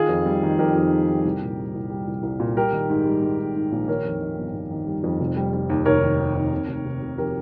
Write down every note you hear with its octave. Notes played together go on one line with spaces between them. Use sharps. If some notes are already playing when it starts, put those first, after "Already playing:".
Already playing: D#3 F4 G#4
F2
G3
D#3
F2 G4 A#4
F2
G3
G3
C2
A#2
G3
C2
G3
C2
C2
A#2
G3 G4 A#4
D#3
G#2
G3
G#2
G#2
G#2
A#1
D#3 A#4 C#5
F2
D#3
G1
G1
D#3
G3
F2
F1
G3
G3
D#2
F1 A#4 C#5
D#3
D#3
D#2
C3
F1
C3
C3
F3 G4 A#4